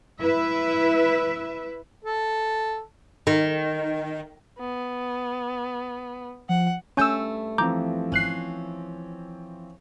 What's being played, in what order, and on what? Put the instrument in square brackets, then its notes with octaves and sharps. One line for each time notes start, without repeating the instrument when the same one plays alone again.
[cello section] E4 B4 E5
[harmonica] A4
[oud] D#3
[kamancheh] B3
[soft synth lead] F3 [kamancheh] F#5
[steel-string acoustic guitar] G2 A3 [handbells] C#4 G#5 G6 [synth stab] C#5 E6
[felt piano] E3 F3 C4 [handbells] A#5 D6 G6
[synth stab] G#1 F#6 C7 [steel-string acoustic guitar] C#4